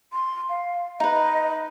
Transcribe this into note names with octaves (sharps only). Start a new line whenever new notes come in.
C6
F5
D#4 B4 D#5